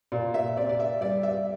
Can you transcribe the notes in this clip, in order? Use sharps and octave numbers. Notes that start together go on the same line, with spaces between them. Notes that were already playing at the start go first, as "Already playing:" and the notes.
A#2 D5
E5
C4 D5
D5
E5
G3 D5
E5